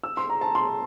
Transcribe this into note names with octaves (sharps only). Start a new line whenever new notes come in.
E6
C6
A#5
A5
C6